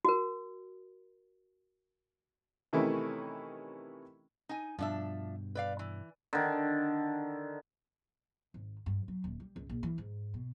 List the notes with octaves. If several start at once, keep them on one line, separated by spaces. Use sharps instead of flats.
F#4 A#4
C3 D#3 E3 A3 C#4 E4
D#4 G#5
G2 B2 F3 D4 E5
B4 D5 F5
E3
D3 D#3
G#1
G2
F#3
D#1
G3
C#2
A#1
E3
G#2
B2